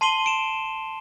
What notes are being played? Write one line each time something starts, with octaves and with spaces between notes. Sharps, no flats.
A5 C6 C7 D#7 F#7 G7
D7 E7